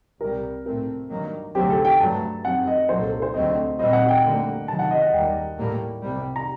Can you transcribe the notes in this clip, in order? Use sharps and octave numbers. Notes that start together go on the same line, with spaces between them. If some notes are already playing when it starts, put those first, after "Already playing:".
C2 C3 G3 A#4
A2 A3 C4 A#4
G2 D#3 F#3 A#3
D2 C3 F#3 C4 G4
A4
G5
G2 F#3 A3 A5
F#2 F#3 C4 F#5
D#5
C2 A#2 F#3 A#3 C5
A4
A4
C5
D2 D3 F#3 A3 C4 D#5
A#2 G3 C4 D#5
F#5
G5
D2 D3 G3 A#3
C2 C3 D#3 F#3 A5
F#5
D#5
F#5
D#2 D#3 G3 A#3 G5
A2 G3 A#3
C2 C3 G3
A#5